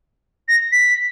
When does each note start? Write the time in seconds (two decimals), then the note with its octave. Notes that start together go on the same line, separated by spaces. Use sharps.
0.48 A#6
0.72 B6